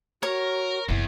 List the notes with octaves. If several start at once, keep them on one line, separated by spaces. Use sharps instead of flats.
F#4 A#4 C#5
F#1 E2 C3 E4